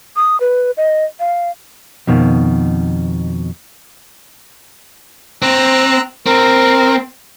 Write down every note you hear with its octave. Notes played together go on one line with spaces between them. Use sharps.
D#6
B4
D#5
F5
F2 B2 D#3
C4 A#5 E6 F#6
C4 A#4